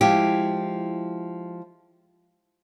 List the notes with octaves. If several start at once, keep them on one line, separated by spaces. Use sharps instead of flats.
F3 G#3 E4 G4